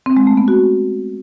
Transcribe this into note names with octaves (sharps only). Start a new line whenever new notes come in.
C4
G#3
A3
B3
F#4